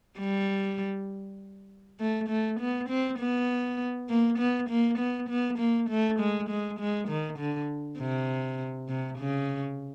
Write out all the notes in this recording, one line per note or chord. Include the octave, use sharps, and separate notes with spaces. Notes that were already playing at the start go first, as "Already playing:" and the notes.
G3
A3
A3
B3
C4
B3
A#3
B3
A#3
B3
B3
A#3
A3
G#3
G#3
G#3
D#3
D3
C3
C3
C#3